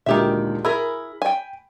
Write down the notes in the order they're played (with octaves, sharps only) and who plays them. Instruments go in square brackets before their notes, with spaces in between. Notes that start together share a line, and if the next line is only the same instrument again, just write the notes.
[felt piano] D2 A#2 G#3 [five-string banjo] D#3 G4 E5
[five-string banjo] E4 G#4 A#4 [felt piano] B5
[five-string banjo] G5 G#5